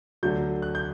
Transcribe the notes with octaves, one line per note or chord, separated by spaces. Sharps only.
D2 D3 F#3 G6
F#6
G6